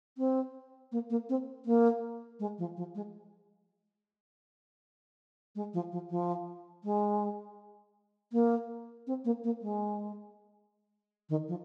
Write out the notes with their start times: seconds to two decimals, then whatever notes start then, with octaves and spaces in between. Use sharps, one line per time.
0.18 C4
0.92 A#3
1.10 A#3
1.29 C4
1.65 A#3
2.39 G#3
2.58 F3
2.77 F3
2.95 G#3
5.55 G#3
5.73 F3
5.92 F3
6.10 F3
6.84 G#3
8.32 A#3
9.07 C4
9.25 A#3
9.44 A#3
9.62 G#3
11.29 D#3
11.48 F3